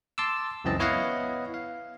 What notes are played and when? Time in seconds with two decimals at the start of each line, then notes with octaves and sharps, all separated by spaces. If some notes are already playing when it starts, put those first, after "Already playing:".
0.18 A5 C6 D6 E6
0.64 C#2 F#2 E3 C4 D#5 A5
0.79 B3 E4 C#5 D#5 F5 F#5
1.54 F5